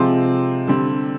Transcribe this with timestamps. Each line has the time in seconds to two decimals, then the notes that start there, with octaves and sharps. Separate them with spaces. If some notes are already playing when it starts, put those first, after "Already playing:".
Already playing: C3 F3 G#3 C4 F4
0.67 D3 G3 C4